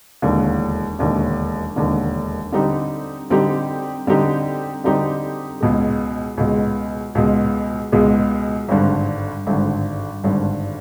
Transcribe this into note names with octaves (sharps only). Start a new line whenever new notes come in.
E1 D#2 D3
E1 D#2 D3
E1 D#2 D3
D3 G3 C4 D#4 G4
D3 G3 C4 D#4 G4
D3 G3 C4 D#4 G4
D3 G3 C4 D#4 G4
C#2 B2 G#3
C#2 B2 G#3
C#2 B2 G#3
C#2 B2 G#3
G#1 G2 D3
G#1 G2 D3
G#1 G2 D3